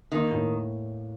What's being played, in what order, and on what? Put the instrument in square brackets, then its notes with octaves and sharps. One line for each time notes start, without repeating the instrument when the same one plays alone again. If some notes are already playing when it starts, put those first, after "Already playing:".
[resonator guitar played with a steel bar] D#3 [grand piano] A#3
[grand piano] A2